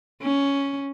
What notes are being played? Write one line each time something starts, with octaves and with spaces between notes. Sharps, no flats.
C#4